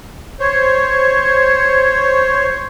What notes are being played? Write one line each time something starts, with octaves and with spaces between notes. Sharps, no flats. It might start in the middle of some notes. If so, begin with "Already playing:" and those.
C5 C#5